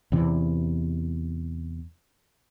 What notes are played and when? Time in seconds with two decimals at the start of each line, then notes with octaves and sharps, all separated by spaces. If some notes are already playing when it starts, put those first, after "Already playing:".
0.12 E2 C3 E3